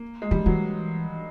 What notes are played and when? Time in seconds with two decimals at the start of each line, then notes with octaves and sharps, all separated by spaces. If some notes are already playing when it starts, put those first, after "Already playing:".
Already playing: A#3
0.22 G#3
0.31 E3 G3
0.46 E3 F#3